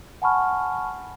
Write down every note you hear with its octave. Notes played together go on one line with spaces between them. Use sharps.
F#5 G#5 A5 B5 C#6 F6